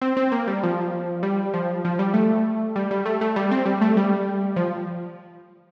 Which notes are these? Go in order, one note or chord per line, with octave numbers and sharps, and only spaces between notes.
C4
C4
A#3
G3
F3
G3
F3
F3
G3
A3
G3
G3
A3
A3
G3
C4
G3
A3
G3
F3